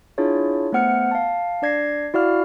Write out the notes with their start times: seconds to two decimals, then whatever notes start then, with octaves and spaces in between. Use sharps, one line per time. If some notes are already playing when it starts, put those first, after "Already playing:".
0.18 D4 E4 F4 G#4 C#5
0.72 A3 B3 C5 F#5 F6 C#7
1.11 F5 A5
1.62 D4 D5 G#6 A#6 C7
2.14 E4 F#4 D5 F5 F6